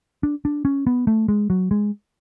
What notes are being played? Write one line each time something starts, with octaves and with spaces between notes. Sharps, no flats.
D4
D4
C#4
B3
A3
G#3
F#3
G#3